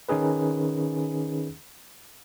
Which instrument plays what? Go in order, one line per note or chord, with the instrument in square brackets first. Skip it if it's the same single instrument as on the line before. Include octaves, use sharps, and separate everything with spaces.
[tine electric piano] D#3 C#4 D#4 G#4 B4